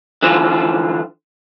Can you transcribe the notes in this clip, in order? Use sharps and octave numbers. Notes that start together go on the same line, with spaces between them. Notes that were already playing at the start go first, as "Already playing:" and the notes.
D3 E3 F3 C5